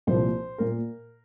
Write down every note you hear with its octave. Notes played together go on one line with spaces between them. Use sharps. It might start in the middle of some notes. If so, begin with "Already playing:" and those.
C2 A#2 F3 C5
A#2 A#4